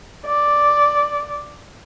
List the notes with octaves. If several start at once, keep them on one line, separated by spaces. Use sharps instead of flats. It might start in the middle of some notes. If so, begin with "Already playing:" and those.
D5